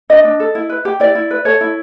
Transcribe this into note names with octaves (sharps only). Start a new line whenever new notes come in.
D4 D#5
D4
A4
E4
B4
G4
E4 D5
E4
B4
A4 C#5
E4